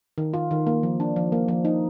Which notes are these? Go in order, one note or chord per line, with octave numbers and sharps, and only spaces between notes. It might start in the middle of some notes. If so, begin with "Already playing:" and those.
D#3
F4
D#3
A#3
F3
D4
F3
A#3
F3
D#4